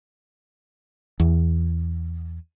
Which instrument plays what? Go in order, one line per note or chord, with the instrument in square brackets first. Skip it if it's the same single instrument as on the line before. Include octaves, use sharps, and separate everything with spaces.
[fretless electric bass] E2